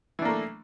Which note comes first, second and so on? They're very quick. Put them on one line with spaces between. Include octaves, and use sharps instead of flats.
E3 D4 A#3 A3